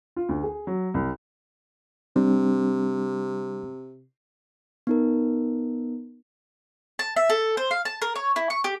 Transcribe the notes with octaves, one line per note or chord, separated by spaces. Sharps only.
F4
D2
G#4
F#3
C2
C3 G3 C4 D4
B3 D#4 A#4
A5
E5
A4
C5
F5
A5
A#4
C#5
E4
C#6
G4